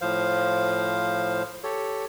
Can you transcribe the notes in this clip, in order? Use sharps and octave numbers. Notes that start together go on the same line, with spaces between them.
A2 F3 C5 F5
G4 A4 C#5